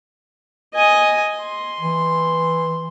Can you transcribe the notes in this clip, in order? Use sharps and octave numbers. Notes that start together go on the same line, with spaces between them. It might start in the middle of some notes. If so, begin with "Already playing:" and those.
D#5 G#5
C6
E3